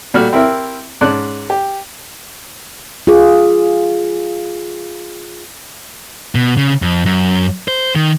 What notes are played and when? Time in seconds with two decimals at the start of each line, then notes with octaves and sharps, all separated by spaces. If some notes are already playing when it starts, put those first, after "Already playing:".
0.14 A#2 G3 A3 F#4 F6
0.33 C4 E4 G4 A#4 E5
1.01 G#2 C#4 D5 A5 F#6
1.50 G4
3.07 F4 G#4
6.35 B2
6.57 C#3
6.82 F2
7.06 F#2
7.68 C5
7.96 D#3